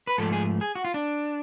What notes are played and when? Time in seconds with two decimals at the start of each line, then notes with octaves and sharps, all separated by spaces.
0.07 B4
0.18 G#2 F3 A3 A4
0.32 G#4
0.61 G#4
0.75 F#4
0.85 F4
0.94 D4